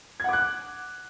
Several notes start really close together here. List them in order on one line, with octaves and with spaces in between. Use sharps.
G#6 F#5 D6 F#6